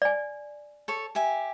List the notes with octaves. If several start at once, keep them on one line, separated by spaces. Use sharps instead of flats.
D5 G#5
A4 C#5
G4 E5 G#5